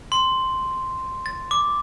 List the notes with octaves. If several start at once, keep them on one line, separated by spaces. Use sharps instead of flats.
C6
A6
D6